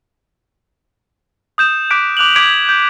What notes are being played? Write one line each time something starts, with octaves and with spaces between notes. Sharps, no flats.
D#6 G6 E7
D6 F#6 G6 B6 D7
D6 F#6 F7 F#7
D6 G#6 B6 D7 F#7
G6